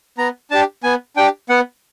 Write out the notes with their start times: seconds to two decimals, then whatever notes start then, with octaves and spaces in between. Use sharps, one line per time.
0.18 B3 A#5
0.51 D4 G4 A5
0.84 B3 G#5
1.16 D4 G4 G5
1.49 B3 F#5